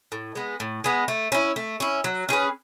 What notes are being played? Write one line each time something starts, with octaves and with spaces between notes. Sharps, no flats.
A2
G#3 B3
A2
G#3 B3
A3
C#4 E4
A3
C#4 E4
F#3
C#4 G#4 B4